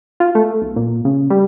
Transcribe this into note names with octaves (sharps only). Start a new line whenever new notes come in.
F4
A3
B1
A#2
C#3
G3